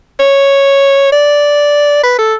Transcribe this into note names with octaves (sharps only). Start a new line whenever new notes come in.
C#5
D5
B4
A4